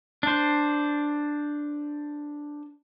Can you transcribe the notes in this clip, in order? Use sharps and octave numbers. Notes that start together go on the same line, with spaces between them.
D4 C5